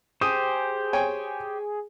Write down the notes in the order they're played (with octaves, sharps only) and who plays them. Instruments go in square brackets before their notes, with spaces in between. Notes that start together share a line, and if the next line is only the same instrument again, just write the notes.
[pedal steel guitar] G4 C5 [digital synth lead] G#4 [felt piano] D#6 D#7
[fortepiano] C#5 G5 G#5